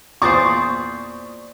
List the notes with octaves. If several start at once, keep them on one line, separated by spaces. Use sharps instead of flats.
E2 A#2 C5 D5 C#6 D#6 A6